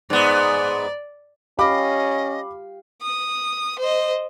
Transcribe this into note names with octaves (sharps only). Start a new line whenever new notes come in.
G#2 B3 D5
C#4 G4 D#5 F5 B5 D6
D#6
C5 D#5